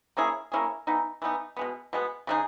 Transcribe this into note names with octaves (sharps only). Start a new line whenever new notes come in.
A#3 C#4 E4 G#4
A#3 C#4 E4 G#4
E3 B3 D#4
E3 B3 D#4
B2 G#3 B3
B2 G#3 B3
C#3 G#3 D#4 G#4